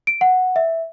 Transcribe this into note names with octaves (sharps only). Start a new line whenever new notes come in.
D7
F#5
E5